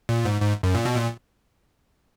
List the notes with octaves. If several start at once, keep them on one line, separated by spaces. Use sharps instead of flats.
A#2
G#2
G#2
F#2
A#2
B2
A#2